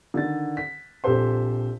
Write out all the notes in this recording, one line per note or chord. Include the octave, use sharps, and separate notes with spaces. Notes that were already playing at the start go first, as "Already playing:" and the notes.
D3 D#3 A6
B6
A#1 C4 G4 A4 C5 C6